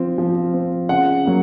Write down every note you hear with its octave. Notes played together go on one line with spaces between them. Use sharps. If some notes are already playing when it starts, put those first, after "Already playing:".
Already playing: F3 C4
F3
C4
C#3 F#5
F#3 A#3